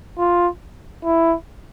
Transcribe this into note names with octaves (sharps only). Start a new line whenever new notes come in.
F4
E4